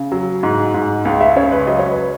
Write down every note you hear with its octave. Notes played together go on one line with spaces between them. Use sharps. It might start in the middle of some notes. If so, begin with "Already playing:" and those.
Already playing: C#3
F#3
G#2
G#2
C#2
E5
C#3 C#5
B4
F#3 D#5
C#5
B4